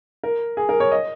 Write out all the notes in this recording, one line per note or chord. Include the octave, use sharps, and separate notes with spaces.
A#4
G#4
A#4
C#5
D#5